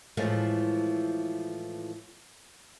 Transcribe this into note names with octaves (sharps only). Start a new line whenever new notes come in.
A2 E3 F3 G#3 A3